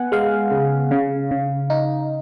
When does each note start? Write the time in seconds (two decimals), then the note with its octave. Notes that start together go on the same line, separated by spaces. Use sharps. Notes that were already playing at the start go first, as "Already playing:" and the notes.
Already playing: B3 F#5 G#5
0.12 G#3 F5
0.51 C#3
0.91 C#3
1.31 C#3
1.70 D#4